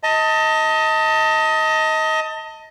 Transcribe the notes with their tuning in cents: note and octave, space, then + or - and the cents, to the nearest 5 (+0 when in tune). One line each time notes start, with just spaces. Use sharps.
D#5 +25 A5 +30